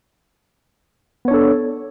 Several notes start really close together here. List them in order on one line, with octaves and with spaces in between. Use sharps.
B3 C#5 D4 A4